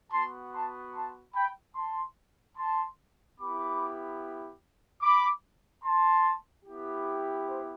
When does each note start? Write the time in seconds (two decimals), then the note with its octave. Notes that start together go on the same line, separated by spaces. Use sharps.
0.11 B3 F#4 A5 C6
0.53 A5 C6
0.93 A5 C6
1.34 G5 B5
1.75 A5 C6
2.57 A5 C6
3.38 B3 E4 G4 B5 D6
5.01 B5 D6
5.83 A5 C6
6.65 B3 E4 G4
7.47 C5